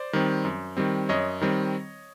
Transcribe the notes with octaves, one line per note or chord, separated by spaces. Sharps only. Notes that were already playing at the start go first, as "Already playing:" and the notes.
Already playing: C5 D5
D#3 G3 C4
F#2
D#3 G3 C4
F#2 C#5 D#5
D#3 G3 C4